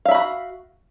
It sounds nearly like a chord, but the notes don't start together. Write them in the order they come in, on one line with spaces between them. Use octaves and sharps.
F5 E5 B5 F#4